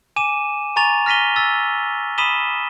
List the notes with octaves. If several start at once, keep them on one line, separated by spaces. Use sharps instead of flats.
G#5 D6 D#7 E7
G#5 A#5 C#6 A6 F7
F6 A#6 B6 D#7 G7
E6 A6 B6
B5 D#6 B6 D#7 E7 G7